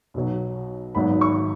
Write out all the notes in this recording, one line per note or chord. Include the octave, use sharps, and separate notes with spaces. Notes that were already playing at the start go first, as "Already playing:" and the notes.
B1 B2 F#3
G#1 G#2 F#3 B3 B5
C#6